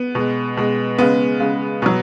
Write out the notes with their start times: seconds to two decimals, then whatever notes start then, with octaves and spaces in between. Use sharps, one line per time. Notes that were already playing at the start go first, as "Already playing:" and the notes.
Already playing: B3
0.15 B2 G#3
0.57 B2 G#3
0.98 C#3 G#3 B3
1.40 C#3 G#3
1.82 B2 F#3 B3